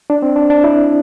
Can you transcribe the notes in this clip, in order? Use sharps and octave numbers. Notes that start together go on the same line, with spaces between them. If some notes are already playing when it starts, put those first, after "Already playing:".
D4
C4
D4
D4
E4